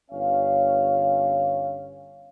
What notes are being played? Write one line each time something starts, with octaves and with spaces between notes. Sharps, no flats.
G1 C#4 C#5 F5